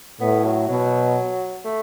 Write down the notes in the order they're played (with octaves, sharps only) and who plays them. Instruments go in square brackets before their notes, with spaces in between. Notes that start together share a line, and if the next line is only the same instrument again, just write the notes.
[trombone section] A2 [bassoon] B3
[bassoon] F#3
[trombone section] B2 [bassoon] F#3
[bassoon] A3